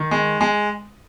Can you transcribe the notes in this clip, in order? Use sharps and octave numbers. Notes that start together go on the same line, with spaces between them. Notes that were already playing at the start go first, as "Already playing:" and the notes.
Already playing: D#3
G#3
G#3